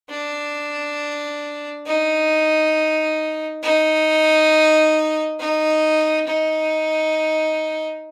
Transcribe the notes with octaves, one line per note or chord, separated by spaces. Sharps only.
D4
D#4
D#4
D#4
D#4